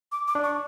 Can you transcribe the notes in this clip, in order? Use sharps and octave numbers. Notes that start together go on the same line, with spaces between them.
D6
D6
D4
C#6